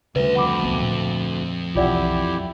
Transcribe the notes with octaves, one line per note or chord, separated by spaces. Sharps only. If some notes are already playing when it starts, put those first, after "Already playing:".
D2 C#3 G3 B4 D5 E5
F2 F#5 B5 D6
D#1 B1 B3
A#2
B1 E2 E4 F4 G4 D5 F#5